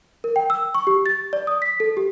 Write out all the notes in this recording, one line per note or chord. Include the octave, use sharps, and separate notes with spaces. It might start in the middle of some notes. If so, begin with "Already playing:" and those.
A#4
G5
E6
C#6
G4
A6
D5
D#6
B6
A4
G4